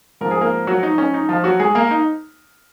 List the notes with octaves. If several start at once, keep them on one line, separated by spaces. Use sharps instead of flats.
G#2 F3 C4 A#4
G#4
A#3 A#4
F#3 F#4
D#4
C#4
D#4
F3 F4
F#3 F#4
G#3 G#4
A#3 A#4
D#4